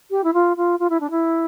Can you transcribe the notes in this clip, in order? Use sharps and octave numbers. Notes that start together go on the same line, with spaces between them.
G4
E4
F4
F4
F4
E4
D4
E4